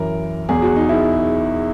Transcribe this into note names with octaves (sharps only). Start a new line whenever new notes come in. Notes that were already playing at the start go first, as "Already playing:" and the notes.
Already playing: F#2 E3 A#4
E2 B2 F#3 G#4
F#4
D#4
E4